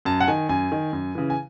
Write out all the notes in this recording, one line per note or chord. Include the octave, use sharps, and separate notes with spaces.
F#2 A5
F#5
D#3 G#5
F#2 G#5
D#3
F#2
C#3 E3
G#5